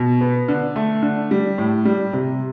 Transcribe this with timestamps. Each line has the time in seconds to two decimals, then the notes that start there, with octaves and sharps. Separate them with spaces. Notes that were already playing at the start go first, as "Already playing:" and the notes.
Already playing: B2
0.21 B3
0.48 D3
0.76 A3
1.02 D3
1.31 G3
1.58 A2
1.85 G3
2.13 C3